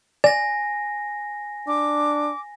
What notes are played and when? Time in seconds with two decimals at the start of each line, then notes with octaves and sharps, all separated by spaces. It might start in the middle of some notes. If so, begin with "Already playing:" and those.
0.24 D5 G#5 A#6
1.68 D4 D6